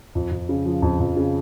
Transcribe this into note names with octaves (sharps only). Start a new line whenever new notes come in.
F2
F2
C#3
F3
F2
F2
C#3